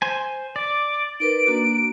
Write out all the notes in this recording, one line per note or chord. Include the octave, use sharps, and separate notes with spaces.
C5 G#5
D5 D6
D#4 A#4 B4 D7
A#3 D4 F#4